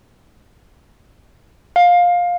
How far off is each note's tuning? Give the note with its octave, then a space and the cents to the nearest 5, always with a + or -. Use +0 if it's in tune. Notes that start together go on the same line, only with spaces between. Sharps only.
F5 +15